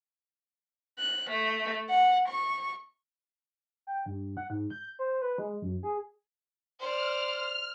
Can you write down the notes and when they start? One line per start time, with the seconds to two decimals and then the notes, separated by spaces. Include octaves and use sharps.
0.99 F#6
1.30 A3
1.89 F#5
2.29 C#6
3.87 G5
4.06 G2
4.37 F#5
4.50 G#2
4.70 G6
4.99 C5
5.22 B4
5.38 G#3
5.62 F#2
5.83 G#4
6.80 C5 D5 F6